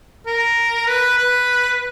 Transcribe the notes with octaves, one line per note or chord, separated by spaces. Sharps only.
A#4
B4
B4